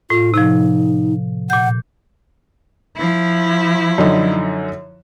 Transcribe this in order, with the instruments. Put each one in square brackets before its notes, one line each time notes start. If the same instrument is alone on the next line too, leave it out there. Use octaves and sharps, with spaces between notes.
[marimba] A2 [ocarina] F4
[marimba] C3 F3 [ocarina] D#4
[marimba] A#2 G6 [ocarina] F#5
[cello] F3 E4
[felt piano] F#2 D3 D#4